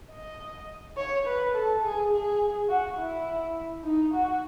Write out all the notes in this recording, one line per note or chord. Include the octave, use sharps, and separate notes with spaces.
D#5
C#5
B4
A4
G#4
G#4
F#4
E4
D#4
F#4